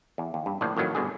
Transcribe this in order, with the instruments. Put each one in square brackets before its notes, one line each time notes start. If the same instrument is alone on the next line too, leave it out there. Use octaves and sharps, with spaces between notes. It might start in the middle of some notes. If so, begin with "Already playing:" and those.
[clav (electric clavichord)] E2
D#2
G2
A#1 A2 D3 F3
F2 A2 D#3 F#3
G1 B2 D3 G#4